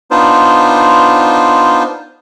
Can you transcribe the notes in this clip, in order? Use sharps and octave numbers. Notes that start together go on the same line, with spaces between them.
B3 D4 D#4 F4 C5